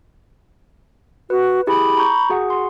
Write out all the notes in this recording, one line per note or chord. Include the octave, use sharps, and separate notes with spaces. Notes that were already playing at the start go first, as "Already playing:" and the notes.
F#4 B4
E4 G4 G#4 B5
A#5 C#6 G6
F#4 G#4 F#5
C6